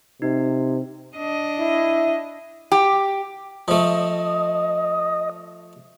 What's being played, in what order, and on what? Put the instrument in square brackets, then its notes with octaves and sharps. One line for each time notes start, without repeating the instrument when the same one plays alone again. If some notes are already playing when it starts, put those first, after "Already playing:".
[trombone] C3 [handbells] D#4
[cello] D4 D#5
[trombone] E4
[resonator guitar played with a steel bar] G4
[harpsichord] F3 A3 [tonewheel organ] D#5